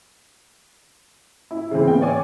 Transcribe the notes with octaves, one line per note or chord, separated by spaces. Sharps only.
E4
C#3 E3 C4
B3 G5
C#5 D5 G#5 D6